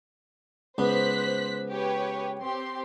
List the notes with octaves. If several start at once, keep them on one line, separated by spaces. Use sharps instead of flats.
C#2 B3 C5 F#6 B6
G4 B4 C#5
C4 G4 C6